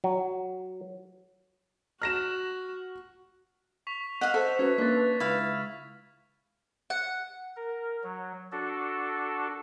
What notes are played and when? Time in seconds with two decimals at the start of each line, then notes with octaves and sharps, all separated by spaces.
0.04 F#3
2.02 F#4 F6 A#6 E7
3.87 C#6 B6 F7
4.21 D#5 F5 F#5 B6
4.34 A4 C5 E5
4.59 C#4 F#4 B4 G#6 B6
4.78 A#3 C#4 D4 A6 B6
5.20 C#2 E4 F5
6.90 F#5
7.56 A#4
8.04 F#3
8.52 D4 F#4 A4